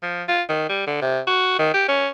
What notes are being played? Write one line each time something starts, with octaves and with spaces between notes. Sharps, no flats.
F3
F4
D#3
G3
D3
C3
F#4
D#3
G4
C#4